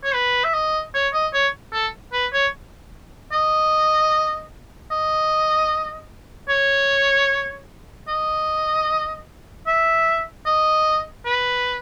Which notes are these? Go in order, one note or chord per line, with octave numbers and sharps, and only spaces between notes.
C#5
B4
E5
D#5
C#5
D#5
C#5
A4
B4
C#5
D#5
D#5
C#5
D#5
E5
D#5
B4